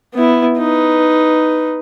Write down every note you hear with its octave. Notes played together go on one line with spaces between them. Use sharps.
B3 E4
D#4 B4